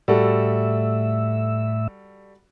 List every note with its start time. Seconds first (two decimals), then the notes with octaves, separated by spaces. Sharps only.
0.08 A2 G3 F#4 A4 E5